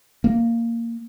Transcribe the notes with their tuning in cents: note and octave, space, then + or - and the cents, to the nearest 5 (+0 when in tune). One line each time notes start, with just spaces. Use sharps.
A#3 -10